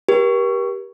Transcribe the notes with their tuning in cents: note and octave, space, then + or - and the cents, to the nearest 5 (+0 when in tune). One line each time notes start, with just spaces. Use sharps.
G4 +0 A#4 +40